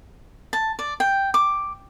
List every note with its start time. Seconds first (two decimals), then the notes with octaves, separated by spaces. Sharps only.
0.53 A5
0.79 D5
1.00 G5
1.34 D6